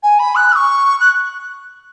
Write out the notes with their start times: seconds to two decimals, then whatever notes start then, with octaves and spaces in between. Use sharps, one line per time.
0.03 G#5
0.19 B5
0.35 F#6
0.52 E6
0.55 C#6
1.00 F#6